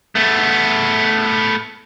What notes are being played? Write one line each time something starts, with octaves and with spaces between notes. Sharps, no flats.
A3 B3